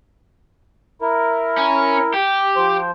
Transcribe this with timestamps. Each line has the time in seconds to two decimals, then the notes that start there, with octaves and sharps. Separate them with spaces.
1.02 E4 A#4
1.57 C#4
2.14 G4
2.56 F3 C5